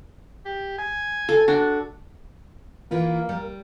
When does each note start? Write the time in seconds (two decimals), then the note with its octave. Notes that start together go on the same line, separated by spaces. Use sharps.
0.45 G4
0.79 G#5
1.29 A4
1.48 D4 F#4
2.91 E3 A#3 E4 F4 A#4
3.29 G3